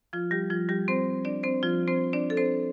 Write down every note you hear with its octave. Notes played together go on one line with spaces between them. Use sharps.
F3 F4
G3 G4
F3 F4
G3 G4
C4 C5
D4 D5
C4 C5
F3 F4
C4 C5
D4 D5
A4
C4 C5